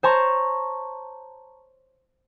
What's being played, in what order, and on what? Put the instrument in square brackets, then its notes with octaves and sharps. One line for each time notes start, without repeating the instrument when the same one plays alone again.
[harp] C5 C#5 A5 A#5 C6 C#6